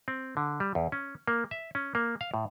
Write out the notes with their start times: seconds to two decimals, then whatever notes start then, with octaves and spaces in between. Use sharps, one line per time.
0.08 C4
0.37 D3
0.60 G3
0.75 E2
0.92 C#4
1.28 A#3
1.51 E5
1.75 C#4
1.95 A#3
2.21 F5
2.34 A2